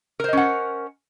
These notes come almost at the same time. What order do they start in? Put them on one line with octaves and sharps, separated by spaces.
A#4 C5 D#5 C#4 F#5